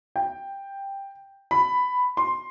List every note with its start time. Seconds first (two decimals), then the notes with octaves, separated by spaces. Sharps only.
0.16 G5
1.51 B5
2.17 C6